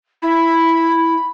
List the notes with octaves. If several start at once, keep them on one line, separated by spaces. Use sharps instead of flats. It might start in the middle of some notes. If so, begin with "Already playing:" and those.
E4 B5